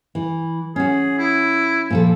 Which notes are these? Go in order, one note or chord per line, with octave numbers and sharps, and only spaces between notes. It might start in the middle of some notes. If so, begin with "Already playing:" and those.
E3
C#4 F#4 G#4
E4
A#2 F3 A4